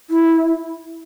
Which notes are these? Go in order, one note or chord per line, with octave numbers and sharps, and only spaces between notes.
E4